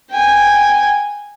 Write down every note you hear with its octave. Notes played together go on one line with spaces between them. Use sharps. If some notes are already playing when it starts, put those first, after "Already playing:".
G5 G#5